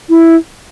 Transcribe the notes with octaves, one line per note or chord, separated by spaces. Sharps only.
E4